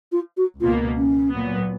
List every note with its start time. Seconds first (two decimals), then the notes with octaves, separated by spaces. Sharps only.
0.12 F4
0.37 F#4
0.59 C#2 B2 A#3 F4
0.96 C#4
1.32 A#2 F#3 B3